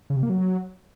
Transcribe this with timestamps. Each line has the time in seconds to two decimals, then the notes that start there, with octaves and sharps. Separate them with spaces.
0.10 C#3
0.16 C3
0.23 A#3
0.30 F#3